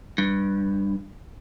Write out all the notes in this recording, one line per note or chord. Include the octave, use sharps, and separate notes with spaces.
G2